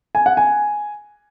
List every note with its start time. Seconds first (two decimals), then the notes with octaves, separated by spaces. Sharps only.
0.15 G#5
0.26 F#5
0.37 G#5